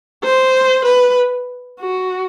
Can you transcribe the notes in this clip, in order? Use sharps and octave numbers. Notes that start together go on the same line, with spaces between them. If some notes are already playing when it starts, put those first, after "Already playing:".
C5
B4
F#4